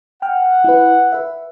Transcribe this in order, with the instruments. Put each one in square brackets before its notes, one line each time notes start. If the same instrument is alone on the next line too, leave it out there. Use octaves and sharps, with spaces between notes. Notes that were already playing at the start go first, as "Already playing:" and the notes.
[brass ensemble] F#5 [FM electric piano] G5 F6
[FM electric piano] E4 B4
B4 E5